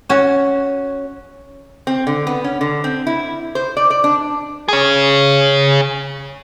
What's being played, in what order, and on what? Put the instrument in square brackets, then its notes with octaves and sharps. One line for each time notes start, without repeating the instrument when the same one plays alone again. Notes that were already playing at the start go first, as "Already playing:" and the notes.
[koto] C#4 F#4
[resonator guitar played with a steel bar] C4
D3
B3
C#4
D3
C4
E4
C5
D5
D5
D4
[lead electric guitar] G#4 C#5